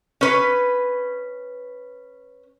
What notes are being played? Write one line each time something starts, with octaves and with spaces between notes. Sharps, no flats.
C#4 B4